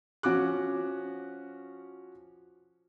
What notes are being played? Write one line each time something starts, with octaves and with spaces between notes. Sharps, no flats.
F3 C#4 F#4 D6 F#6